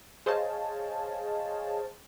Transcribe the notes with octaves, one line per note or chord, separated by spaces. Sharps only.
G#4 C5 C#5 D#5 F5 A5